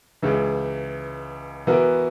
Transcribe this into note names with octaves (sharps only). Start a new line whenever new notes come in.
C#2 C#3 E3
E3 B3 F#4 A#4